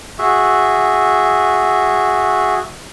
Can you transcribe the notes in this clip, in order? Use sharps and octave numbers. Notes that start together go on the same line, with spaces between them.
F#4 G#4 E5